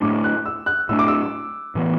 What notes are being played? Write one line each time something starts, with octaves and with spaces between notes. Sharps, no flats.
A2 A3 D4 D6
F#6
E6
F#6
A2 A3 D4 E6
D6
E6
A2 E3 B3